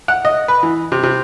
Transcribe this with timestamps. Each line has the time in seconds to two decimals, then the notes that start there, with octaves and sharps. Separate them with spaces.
0.08 F#5
0.25 D#5
0.48 B4
0.63 E3
0.92 C3
1.03 C3